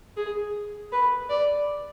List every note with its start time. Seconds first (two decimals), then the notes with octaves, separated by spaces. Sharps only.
0.17 G#4
0.92 B4
1.29 D5